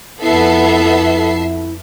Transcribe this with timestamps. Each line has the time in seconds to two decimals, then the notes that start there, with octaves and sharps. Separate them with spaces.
0.22 F2 B3 E4 A4 E5 C7